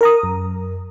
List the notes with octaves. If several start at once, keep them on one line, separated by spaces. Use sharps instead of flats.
A#4 A#5 D#6
F#2